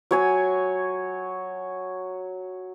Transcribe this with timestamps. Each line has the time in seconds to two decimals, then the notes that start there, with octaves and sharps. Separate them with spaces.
0.11 F#3 C#5 G#5